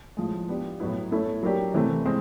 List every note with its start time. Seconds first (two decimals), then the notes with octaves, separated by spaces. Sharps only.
0.17 A2 F3 G#3
0.48 B3 D4 G4
0.80 A2 F#3 B3 E4
1.11 A3 C#4 E4 A4
1.43 F#3 A#3 D4 G4
1.74 C3 E3 A3 C4
2.05 G#3 C4